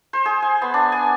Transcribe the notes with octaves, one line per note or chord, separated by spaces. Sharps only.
C5
G#4
G#5
B3
D4
G#5